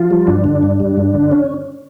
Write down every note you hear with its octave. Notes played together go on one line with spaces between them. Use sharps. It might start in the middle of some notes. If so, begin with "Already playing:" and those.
Already playing: F3 F4
G3
G2 D4
D3
G2
G3
G2
D3
C#4